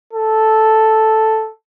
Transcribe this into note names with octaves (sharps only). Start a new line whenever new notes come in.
A4